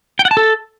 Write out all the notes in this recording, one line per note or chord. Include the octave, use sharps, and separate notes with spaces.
G5
F#5
A5
A4